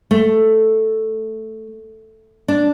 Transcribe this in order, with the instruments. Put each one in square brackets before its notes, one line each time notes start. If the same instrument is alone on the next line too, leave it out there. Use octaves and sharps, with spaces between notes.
[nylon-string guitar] A3
D4